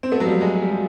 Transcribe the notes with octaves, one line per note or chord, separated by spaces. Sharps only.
C4
A3 B3
F#3
F3 G3
F#3 G#3
G#3
G3
F#3